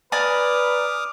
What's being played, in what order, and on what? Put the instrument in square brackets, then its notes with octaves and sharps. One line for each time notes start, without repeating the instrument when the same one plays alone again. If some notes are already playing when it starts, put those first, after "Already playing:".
[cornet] B4 [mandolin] D5 G#5 A#5 [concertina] D6 D#6 F6